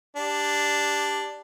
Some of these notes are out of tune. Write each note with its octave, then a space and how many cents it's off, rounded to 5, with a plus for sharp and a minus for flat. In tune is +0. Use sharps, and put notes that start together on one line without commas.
D4 +0 G4 +5